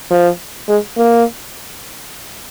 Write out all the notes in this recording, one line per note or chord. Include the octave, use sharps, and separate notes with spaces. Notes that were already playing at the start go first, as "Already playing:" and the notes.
F3
G#3
A#3